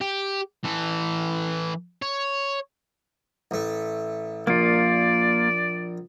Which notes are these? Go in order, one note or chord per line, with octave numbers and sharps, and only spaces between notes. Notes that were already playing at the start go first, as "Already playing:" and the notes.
G4
E3 A4
C#5
A1 A3
A#1 A#3 F4 D5